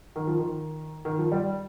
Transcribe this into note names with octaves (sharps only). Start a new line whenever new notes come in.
D#3
F3
D#3
D#3
F3
G3